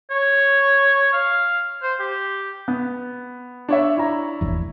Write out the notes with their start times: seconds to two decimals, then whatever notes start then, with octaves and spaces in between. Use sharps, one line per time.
0.11 C#5
1.13 F5
1.83 C5
2.00 G4
2.68 B3
3.68 D4 C#5 E5
3.97 E4 A#5
4.41 F1 A#1 E2